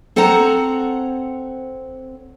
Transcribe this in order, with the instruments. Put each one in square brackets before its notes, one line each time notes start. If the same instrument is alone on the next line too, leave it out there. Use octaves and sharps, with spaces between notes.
[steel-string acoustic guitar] C4 A4 C5 C#5 F#5 A#5